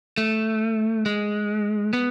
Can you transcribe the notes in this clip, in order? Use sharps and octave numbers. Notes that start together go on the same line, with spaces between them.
A3
G#3
B3